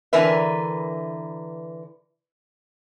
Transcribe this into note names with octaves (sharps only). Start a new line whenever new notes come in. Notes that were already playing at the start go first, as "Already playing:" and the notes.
D3 E3 A#4 B4 E5